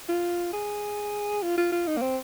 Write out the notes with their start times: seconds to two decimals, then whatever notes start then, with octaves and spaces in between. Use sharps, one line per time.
0.09 F4
0.53 G#4
1.42 F4
1.58 F4
1.72 F4
1.87 D#4
1.97 A#3
2.02 C4